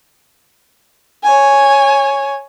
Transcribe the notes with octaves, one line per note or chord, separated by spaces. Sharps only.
C#5 G#5